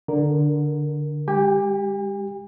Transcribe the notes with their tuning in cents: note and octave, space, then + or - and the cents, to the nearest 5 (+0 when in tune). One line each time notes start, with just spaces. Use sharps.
D3 +0 A#4 +5
G#3 -40 G4 +0 G#5 -45